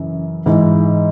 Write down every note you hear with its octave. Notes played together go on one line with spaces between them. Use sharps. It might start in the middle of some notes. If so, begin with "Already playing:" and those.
Already playing: F#2 C#3 E3
G#2 E3